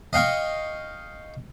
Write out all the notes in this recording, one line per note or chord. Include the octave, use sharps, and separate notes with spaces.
D#5 F5 G5 C#6